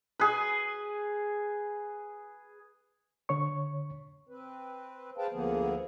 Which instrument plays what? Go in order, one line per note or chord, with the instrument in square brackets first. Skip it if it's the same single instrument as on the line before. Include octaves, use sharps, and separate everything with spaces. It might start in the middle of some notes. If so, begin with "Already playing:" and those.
[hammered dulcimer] G#4 B4
[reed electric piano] D3 C#5 C#6
[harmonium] C4 B4
G#4 B4 C5 F5 G5 A5
D2 D3 F3 A#3 B3 G#4